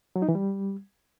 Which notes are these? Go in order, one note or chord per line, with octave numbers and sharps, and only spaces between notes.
F#3
D#4
E3
G3